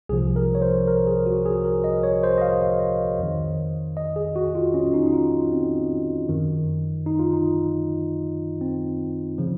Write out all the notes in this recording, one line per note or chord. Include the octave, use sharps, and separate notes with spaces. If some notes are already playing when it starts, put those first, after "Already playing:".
C2 C3 F3 G#4
A#4
C#5
C5
A#4
G#4
F#4
G#4
A#4
D#5
C#5
C5
D#5
F5
F2 D#3
D#5
G#4
F#4
F4
C#4
D#4
D#4
F4
C4
F#2 D#3
D#4
F4
D#4
C4
C#3 F3